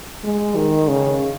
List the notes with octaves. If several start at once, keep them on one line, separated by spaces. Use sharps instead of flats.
G#3
D#3
C#3